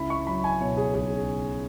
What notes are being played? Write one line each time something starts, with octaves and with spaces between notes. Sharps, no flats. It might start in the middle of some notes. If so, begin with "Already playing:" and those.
Already playing: C#2 C#3 E4 B5
C#6
F#3 B5
G#5
B2 C#5
G#4
B1 G#4